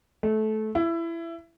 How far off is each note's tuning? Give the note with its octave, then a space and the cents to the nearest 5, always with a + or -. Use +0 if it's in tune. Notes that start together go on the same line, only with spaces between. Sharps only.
A3 -20
E4 +20